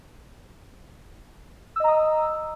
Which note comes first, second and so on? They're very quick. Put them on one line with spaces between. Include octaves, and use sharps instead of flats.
E6 D#5 A#5 D#6